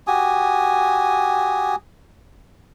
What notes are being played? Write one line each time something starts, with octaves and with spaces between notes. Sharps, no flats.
F#4 G4 G#5 D#6